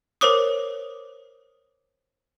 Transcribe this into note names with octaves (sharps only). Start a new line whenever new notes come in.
A#4 C5 C#5 D6 D#6